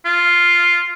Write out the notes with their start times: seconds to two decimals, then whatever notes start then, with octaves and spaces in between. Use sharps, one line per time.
0.05 F4